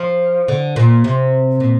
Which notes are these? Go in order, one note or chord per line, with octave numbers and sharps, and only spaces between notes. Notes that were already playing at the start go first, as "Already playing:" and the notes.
Already playing: F3
D3
A#2
C3
A#2